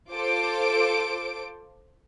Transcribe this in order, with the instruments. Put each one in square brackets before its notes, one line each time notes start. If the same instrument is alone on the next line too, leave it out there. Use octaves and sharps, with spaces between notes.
[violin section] F4 A4 C5 D6 D7